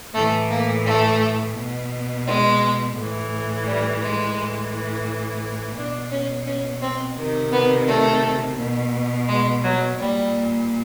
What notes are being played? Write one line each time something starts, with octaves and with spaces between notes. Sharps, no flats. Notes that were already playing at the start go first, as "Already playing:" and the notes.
A2 E3 A3
A#3
A3
B2
G#3
A2 E3
G3
G#3
A2 E3
B2 D4
C#4
C#4
C4
C3 D#3
B3
A3
B2
G#3
F#3
A#2 G3